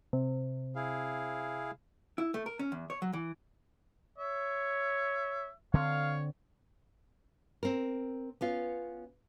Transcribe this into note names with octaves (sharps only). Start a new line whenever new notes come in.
C3
E4 G#4 F5
E4
A3
A#4
C#4
E2
C#5
F#3
E3
C#5 E5
D3 C4 C#5 F5
C4 A#4
B3 C#4 F4